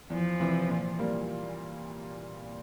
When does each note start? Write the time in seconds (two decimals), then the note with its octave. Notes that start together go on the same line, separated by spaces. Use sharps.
0.10 E2 F3
0.40 C3 E3
0.69 A#2
0.98 G3 A#3